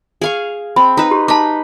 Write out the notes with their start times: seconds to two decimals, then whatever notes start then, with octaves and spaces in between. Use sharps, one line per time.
0.22 G#4 F5 C#6
0.76 C4 B5
0.97 D#4 B4
1.11 F#4 G4
1.28 D#4 A5 B5 D6